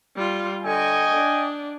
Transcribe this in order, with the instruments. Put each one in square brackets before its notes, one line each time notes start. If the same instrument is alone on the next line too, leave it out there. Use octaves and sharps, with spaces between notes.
[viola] G3 F4
[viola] D3 C#6 [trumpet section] D#5 G5 G#5
[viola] D4